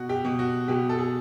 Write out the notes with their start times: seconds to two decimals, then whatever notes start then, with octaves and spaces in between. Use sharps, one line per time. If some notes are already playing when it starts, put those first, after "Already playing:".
Already playing: B2 F#4
0.09 G4
0.24 B2
0.39 F#4
0.68 B2 G4
0.89 A4
0.99 G#4